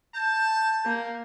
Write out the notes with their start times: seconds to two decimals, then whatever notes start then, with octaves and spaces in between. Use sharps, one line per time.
0.15 A5 G6
0.86 A#3